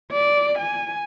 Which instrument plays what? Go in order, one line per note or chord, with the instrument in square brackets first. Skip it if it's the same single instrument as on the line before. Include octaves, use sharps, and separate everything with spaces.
[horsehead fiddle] D5
G#5